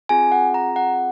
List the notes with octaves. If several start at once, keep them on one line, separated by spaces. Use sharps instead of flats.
C4 F4 G#4 G#5
F#5
A#5
F#5